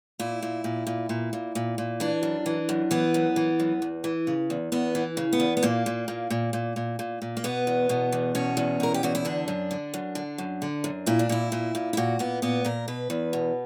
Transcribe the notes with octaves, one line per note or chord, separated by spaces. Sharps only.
A#2 E4
A#2
A#2
A#2
A#2
A#2
A#2
A#2
E3 D4
F#2
E3
F#2
E3 B3
F#2
E3
F#2
E2
E3
C#3
E2
E2 B3
E3
C#3
B3
E2
B3
A#2 A#3
A#2
A#2
A#2
A#2
A#2
A#2
A#2
A#3
B2 B3
E2
B2
E2
B2 C#4
E2
B2 A#4
G4
E2 F#4
E4
D3 D4
F#2
D3
F#2
D3
F#2
D3
F#2
A#2 E4
D4
A#2 E4
A#2
A#2
E4
A#2 F#4
A#2 B3
A#2 B3
A#2 A#4
B2 B4
E2
B2